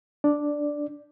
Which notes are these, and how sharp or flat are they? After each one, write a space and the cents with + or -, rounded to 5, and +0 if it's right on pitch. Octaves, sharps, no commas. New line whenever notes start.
D4 -5 D5 +0